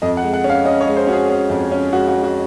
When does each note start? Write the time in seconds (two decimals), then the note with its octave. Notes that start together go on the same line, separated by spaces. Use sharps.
0.02 F2 D#5
0.17 F#5
0.23 G#3
0.33 F#5
0.44 C#4
0.49 F5
0.65 C#4 D#5
0.81 C#5
0.87 G#3
0.97 C5
1.07 C#4 F#4
1.13 G#4
1.29 C#4
1.50 F2
1.71 C#4
1.93 G#3 F#4
2.08 F#4
2.13 G#3
2.24 F#4